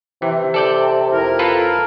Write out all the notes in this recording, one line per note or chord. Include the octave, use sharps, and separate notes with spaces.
C3 E3
A4 D5 G5
F2 E4 A#4
F4 A4 B4